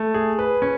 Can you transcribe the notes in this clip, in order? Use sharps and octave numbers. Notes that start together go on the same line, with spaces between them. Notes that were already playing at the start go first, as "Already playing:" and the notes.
Already playing: A3
G#4
B4
C#4